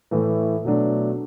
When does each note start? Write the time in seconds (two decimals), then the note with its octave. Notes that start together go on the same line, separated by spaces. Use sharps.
0.11 A2 E3 A3
0.65 B2 F#3 A3 D4